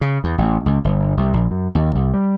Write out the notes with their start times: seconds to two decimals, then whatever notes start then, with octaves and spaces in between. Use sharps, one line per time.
0.01 C#3
0.24 E2
0.38 A1
0.66 C#2
0.85 G1
1.17 C2
1.33 A#1
1.51 F#2
1.75 D#2
1.95 C2
2.14 G3